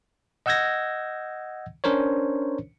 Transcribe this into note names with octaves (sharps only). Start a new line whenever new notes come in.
D#5 F#5 E6 G6 G#6 A#6
C#4 D4 A#4 C5 C#5